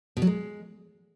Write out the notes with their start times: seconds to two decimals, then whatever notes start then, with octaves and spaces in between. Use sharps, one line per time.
0.17 B2
0.22 F#3
0.27 G#3